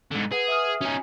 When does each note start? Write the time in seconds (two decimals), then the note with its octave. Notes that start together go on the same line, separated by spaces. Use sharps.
0.11 G#2 D3
0.32 G#4 B4 F#5
0.48 E5 D#6 F6
0.81 C#4 D#4 F#4 G#5